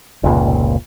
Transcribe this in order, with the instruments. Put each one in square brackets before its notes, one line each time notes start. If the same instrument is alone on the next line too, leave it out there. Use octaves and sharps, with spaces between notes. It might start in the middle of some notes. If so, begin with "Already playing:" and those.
[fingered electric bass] F1 C#2 A#2